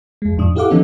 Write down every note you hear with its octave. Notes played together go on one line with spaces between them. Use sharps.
F2 G#3
F2 A2 D4 D#6
E4 G4 A4 F5 F#5 D6
E3 F3 B3 C#4 D#4 A4